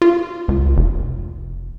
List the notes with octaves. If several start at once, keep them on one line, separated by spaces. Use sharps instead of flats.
F4
C#2
F1